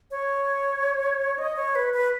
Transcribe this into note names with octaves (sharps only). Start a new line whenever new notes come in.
C#5
D#5
C#5
B4
B4